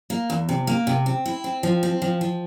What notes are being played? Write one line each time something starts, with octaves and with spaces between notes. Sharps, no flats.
A#3
E2
C3
A#3
C3
C4
E4
C4
F3
C4
F3
F3